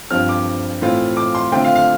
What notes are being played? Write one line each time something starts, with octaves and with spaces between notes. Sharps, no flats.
G2 F3 C4 F6
D6
A2 E3 A3 C4 F4
D6
C6
D3 A3 C4 F4 G5
F5
F5